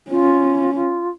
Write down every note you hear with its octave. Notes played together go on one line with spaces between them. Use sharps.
C#4 F4
F4